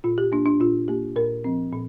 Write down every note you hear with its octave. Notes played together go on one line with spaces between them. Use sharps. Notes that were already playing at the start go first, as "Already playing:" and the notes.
A#2 F4
G4
A#3 D4
D4
A#2 F4
A#3 G4
A#2 A#4
F3 C4
A#2